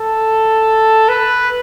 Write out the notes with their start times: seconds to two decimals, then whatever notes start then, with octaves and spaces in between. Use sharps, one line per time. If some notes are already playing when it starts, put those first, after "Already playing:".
Already playing: A4
1.09 B4